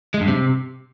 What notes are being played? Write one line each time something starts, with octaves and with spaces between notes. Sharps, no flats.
G#3
G2
C3